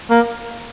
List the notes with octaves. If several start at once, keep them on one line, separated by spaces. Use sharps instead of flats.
A#3